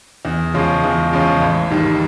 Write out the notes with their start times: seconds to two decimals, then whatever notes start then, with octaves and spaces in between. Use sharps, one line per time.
0.25 E2
0.54 C#3 F3 G#3 C#4
0.83 E2
1.13 C#3 F3 G#3 C#4
1.42 A1
1.70 G#2 D#3 G3